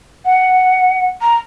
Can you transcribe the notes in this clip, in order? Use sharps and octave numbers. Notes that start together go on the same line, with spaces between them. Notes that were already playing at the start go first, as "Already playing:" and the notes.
F#5
A#5